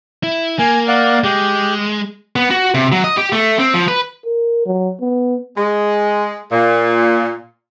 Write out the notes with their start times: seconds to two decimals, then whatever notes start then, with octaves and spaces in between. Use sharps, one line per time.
0.23 E4
0.59 A#3 G#5
0.88 D5 F5 F#5
1.24 G#3 G4
2.36 B3
2.50 F#4
2.74 C3
2.92 F#3
3.04 D#5
3.17 G4
3.33 A3
3.60 C4
3.74 F3
3.88 B4
4.25 A#4
4.66 F#3
5.01 B3
5.56 G#3
6.52 A#2